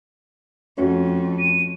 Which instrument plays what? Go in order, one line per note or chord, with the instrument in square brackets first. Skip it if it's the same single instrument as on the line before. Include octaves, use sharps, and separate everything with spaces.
[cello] F2 [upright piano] A3 C#4 F#4
[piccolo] D#7